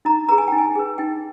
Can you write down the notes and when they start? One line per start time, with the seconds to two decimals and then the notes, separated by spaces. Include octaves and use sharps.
0.05 D#4 A#5
0.29 G#4 B4 A#5
0.38 G#5
0.48 D#4 G5
0.58 G#5
0.75 G#4 B4
0.98 D#4 G5